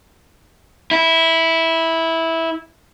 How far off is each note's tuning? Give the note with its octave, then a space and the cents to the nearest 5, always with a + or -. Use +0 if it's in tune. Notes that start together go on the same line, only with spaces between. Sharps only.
E4 -10